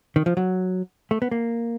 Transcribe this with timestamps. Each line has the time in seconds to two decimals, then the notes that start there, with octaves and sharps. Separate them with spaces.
0.16 D#3
0.26 F3
0.37 F#3
1.11 A3
1.22 B3
1.31 A#3